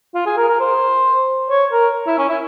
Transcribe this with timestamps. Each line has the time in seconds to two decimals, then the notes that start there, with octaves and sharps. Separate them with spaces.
0.15 F4
0.26 G#4
0.37 A#4
0.49 A#4
0.60 C5
1.50 C#5
1.72 A#4
2.07 E4
2.18 C#4
2.29 E4